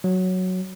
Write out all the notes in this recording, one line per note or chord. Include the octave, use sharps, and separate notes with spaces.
F#3